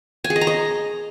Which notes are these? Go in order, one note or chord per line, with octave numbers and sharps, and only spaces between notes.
G#5
G#4
D#5
A#5
D#5